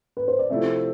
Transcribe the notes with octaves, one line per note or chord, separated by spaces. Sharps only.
B4
C5
D5
C3 F3 A3 C4 E4 E5